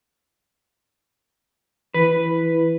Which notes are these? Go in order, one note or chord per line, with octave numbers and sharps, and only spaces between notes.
E3 B4